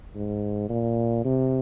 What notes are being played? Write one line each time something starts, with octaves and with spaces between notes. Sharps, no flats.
G#2
A#2
C3